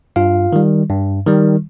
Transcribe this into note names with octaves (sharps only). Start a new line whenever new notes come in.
G2 F4 F5
D#3 G3
G2
D#3 G3